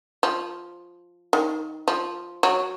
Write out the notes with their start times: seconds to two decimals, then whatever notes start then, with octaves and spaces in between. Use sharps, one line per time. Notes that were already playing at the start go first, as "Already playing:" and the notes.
0.23 F3
1.33 D#3
1.88 F3
2.43 F#3